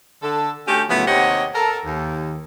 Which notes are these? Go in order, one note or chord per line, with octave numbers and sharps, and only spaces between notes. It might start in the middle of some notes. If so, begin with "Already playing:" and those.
D3 A4
D3 A3 C#4 F#4 G4
A2 C#3 F3 F#3 A3 B3
D#2 C3 G4 C#5 D#5 F#5
A4 A#4
D#2